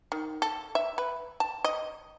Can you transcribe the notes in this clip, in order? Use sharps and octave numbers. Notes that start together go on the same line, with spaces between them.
D#3
A4
E5
B4
A5
D#5